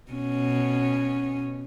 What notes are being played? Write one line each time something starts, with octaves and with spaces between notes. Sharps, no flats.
B2 C#4